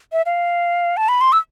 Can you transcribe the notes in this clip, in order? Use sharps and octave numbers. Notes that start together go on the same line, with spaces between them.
E5
F5
A5
B5
C6
E6